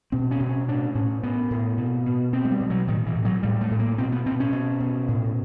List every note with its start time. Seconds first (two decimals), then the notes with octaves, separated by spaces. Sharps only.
0.12 B2 C4
0.31 C#4
0.40 B2
0.49 C#4
0.68 A2 D4
0.95 A2 C#4
1.23 A2 B3
1.50 A2
1.77 B2
2.06 B2
2.33 B2 C4
2.45 G#3
2.51 G3
2.60 B2
2.70 F#3
2.88 A2 D#3
3.06 E3
3.15 A2
3.25 F#3
3.43 A2 G3
3.61 A3
3.71 A2
3.79 A#3
3.98 B2 C4
4.12 B3
4.26 B2 C4
4.40 C#4
4.53 B2
4.80 B2
5.08 A2